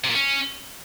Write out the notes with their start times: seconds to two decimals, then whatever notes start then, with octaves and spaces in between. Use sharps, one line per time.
0.04 C3
0.10 A#2
0.15 C#4